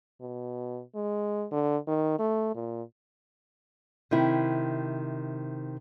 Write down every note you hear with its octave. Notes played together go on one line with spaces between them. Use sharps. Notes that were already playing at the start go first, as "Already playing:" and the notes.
B2
G#3
D3
D#3
A3
A#2
C3 D#3 E4